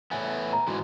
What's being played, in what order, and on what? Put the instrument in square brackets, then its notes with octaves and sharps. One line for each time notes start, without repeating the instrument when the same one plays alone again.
[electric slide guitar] A2 E3 B3 [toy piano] G#5
[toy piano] A#5
[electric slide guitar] G#2 E3 [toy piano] F#4